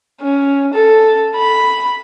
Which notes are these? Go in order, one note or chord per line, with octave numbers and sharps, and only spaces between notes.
C#4
A4
B5